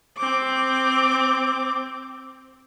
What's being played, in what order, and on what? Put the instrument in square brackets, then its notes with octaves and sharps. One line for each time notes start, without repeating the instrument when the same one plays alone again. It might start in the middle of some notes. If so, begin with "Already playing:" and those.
[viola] C4 D6